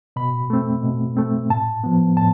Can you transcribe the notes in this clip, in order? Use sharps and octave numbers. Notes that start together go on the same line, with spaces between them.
B2 B5
A3 C4
B2
A3 C4
A2 A5
F3 B3
A2 A5